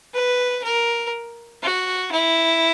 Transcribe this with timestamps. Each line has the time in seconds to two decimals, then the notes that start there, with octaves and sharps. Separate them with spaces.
0.14 B4
0.64 A#4
1.63 F#4
2.11 E4